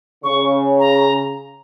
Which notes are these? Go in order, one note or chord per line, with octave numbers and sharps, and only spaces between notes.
C#3 C#6
A#5